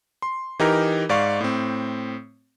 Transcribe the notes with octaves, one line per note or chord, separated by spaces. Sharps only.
C6
E3 D#4 G4 A#4
G#2 D5 F5 C#6
A2 C4